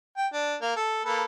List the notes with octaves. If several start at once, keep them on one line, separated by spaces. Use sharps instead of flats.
G5
D4
A#3
A4
A#3 A4 B4